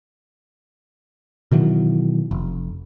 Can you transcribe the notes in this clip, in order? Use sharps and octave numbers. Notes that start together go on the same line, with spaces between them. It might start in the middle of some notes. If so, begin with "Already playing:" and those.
B2 D#3 E3 F#3
F1